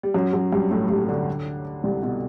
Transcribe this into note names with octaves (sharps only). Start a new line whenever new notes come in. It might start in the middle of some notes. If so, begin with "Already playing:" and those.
G3
F#2 F#3
F#2 F#3
G2 G3
A2 A3
G2 G3
C3
D2 D3
C2 C3
B2